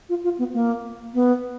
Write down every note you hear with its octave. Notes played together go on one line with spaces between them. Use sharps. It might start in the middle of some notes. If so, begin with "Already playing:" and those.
F4
F4
B3
A#3
B3